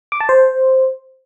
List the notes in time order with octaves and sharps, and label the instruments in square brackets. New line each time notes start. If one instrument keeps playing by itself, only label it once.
[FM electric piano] D6
A5
C5